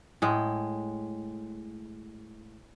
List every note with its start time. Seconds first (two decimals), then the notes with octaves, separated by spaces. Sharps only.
0.22 A2 G#3